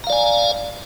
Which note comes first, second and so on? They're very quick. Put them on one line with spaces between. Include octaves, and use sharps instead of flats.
A#5 F5 D5 G#5